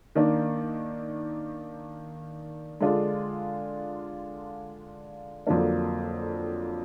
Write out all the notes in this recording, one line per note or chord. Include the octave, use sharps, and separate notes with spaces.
D#3 A#3 D4
D3 G#3 D4 F4
F2 D3 F#3 A#3 D4